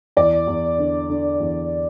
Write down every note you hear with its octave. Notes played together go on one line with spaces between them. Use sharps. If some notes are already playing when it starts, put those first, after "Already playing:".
E2 D5
E2
D3
D3
E2